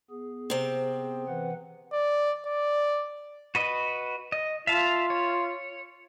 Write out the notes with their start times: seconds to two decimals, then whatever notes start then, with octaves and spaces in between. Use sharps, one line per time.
0.10 B3 G#4
0.50 C3 C4
1.28 E3 B4 F#5
1.93 D5
2.45 D5
3.55 F#4 B4 D#5
4.32 D#5
4.67 F4 E5 F5 A5
5.10 C#5